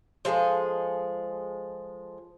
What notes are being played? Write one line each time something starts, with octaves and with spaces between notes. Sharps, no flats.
F3 G#3 G#4 A4